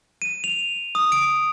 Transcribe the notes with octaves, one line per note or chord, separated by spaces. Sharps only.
D#7
F7
D#6
D7